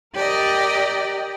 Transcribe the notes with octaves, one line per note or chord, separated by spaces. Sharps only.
G4 A#4 D5 D#5